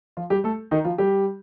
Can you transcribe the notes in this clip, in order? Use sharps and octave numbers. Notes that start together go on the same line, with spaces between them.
F3 F4
G3 G4
A3 A4
D#3 D#4
F3 F4
G3 G4